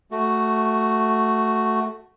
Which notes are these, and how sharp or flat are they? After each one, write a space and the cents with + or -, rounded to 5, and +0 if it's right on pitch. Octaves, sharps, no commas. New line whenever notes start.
A3 +0 F#4 +0